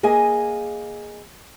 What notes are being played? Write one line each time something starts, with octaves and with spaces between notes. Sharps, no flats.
A#3 G#4 D#5 G#5